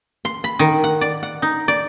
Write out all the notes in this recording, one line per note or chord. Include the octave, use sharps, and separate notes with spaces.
C6
B5
D#3
F#5
D5
F#5
D#4
D5